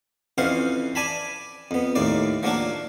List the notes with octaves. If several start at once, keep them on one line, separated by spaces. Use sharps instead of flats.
F2 E3 C#4 C5 F5 F#5
D5 G#5 A5 B5
F2 B3
D#2 A2 A#3 D5
F3 F#3 A#3 D4 F#4